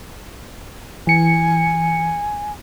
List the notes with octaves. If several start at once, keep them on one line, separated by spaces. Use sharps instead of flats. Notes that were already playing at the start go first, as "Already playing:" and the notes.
E3 G#5 C#7